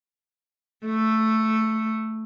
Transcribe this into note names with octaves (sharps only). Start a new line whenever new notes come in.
A3